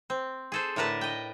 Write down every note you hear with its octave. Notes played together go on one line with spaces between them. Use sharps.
C4
G#4 A4 C5
A2 D3 A#4 B4 A5
D#5 G5